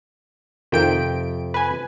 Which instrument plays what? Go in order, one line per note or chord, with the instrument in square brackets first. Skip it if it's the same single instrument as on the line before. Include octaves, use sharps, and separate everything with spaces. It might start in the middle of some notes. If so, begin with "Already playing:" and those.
[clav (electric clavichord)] F2 C3 F3 [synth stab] D#3 G5 D7
[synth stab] B4 G#5